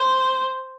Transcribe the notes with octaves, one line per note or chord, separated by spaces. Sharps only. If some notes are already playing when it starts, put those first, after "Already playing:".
Already playing: C5